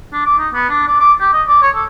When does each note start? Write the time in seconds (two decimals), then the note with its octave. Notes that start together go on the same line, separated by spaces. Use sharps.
0.13 D4
0.25 D6
0.38 D#4
0.53 B3
0.69 D4
0.87 D5
1.00 D6
1.20 G4
1.33 D#5
1.47 D5
1.62 C#5
1.75 A4